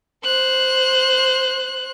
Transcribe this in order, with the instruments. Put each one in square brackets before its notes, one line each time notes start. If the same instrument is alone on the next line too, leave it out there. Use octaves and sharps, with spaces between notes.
[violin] C5 F#6